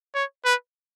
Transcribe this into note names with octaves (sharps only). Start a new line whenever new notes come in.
C#5
B4